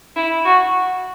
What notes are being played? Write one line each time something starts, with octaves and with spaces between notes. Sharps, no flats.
E4
F#4